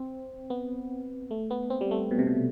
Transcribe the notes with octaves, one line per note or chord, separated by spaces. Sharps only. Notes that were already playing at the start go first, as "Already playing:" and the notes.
Already playing: C4
B3
A3
B3
C4
G3
A3
B2
C3
B2